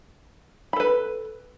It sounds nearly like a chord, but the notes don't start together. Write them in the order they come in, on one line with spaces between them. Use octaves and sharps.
B5 A4 B4